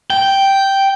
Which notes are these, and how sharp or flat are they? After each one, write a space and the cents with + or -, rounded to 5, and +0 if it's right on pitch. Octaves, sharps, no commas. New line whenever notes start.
G5 -5